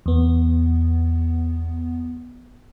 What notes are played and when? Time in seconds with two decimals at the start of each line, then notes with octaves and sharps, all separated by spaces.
0.06 E2 B3